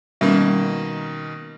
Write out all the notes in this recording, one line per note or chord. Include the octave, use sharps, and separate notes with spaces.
B2 D#3 G3 A#3 C#4